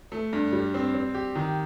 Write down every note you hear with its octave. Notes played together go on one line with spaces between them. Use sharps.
A3
G2
G3
C4
C4
G4
D#3